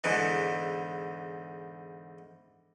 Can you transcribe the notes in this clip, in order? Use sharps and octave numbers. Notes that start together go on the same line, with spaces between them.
E2 G#2 D3 E3